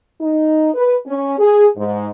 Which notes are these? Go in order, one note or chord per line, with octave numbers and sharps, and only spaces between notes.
D#4
B4
C#4
G#4
G#2